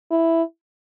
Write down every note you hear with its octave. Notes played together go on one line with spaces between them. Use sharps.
E4